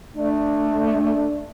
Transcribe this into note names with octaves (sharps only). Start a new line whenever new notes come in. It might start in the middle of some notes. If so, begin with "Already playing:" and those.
A3 D4